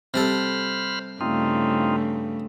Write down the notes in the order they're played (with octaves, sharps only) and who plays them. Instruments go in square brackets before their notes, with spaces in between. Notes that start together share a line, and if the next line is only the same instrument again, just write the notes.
[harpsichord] C3 G3 A4 [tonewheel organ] C5 B5 F6
[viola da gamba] G2 C#3 A3 [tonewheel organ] C4 D#4 F4